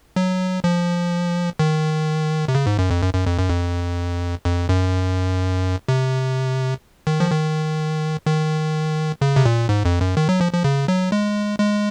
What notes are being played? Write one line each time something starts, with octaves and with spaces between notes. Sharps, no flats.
F#3
F3
D#3
C3
C#3
G#2
F#2
F2
F#2
F#2
F2
F#2
F2
F2
F#2
C3
D#3
F3
D#3
D#3
C#3
C3
A#2
G#2
F2
F#2
D#3
F#3
F3
F3
C#3
F#3
G#3
G#3